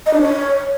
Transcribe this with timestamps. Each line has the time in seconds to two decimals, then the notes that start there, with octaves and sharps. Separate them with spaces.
0.06 D#5
0.14 D4
0.21 C#5